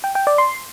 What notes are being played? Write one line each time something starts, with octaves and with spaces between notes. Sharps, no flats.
G5
G5
D5
C6